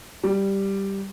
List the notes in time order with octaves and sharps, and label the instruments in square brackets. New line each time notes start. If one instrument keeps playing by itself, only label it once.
[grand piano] G3